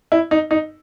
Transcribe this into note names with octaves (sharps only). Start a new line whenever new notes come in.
E4
D#4
D#4